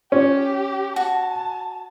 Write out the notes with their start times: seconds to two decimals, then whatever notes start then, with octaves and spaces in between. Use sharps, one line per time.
0.12 C#4 G4
0.96 F#4 A5